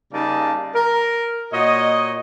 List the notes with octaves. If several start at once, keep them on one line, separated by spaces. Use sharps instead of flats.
C#3 G3 A#3 D#4 D5 A5
A#4
A#2 F#4 C#5 D#5